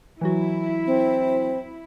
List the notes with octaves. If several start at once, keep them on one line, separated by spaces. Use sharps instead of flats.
E3 F#3 E4 F#4
C4